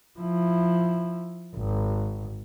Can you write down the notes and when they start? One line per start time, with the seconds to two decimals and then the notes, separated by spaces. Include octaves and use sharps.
0.19 F3 E4
1.56 G#1